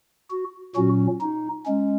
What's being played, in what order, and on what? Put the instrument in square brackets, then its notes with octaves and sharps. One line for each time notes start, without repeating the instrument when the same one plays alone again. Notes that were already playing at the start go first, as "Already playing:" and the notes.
[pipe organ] F#4
A#2 F#3 C#4 F#4
D#4
G#3 C#4